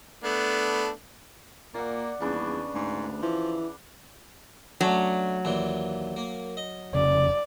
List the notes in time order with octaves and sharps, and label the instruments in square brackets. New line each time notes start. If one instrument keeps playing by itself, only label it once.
[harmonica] A3 B3 D4
[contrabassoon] A#2 [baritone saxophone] A#3 [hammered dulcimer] D5 F#5
[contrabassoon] D#1 [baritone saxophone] E2 [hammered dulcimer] C#3 D4 B4
[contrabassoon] D2 [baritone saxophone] G#2
[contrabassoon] E3 [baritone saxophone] F3
[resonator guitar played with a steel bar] F#3 [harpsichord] A3 C#4 D4
[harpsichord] D#2 A#2 E3
A#3
D#5
[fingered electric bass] F1 C#3 [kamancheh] D5